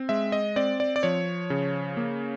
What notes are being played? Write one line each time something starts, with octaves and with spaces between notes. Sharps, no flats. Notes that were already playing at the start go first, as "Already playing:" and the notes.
Already playing: C4
G#3 E5
D#5
C4 D5
D5
D5
F3 C#5
C#3
A#3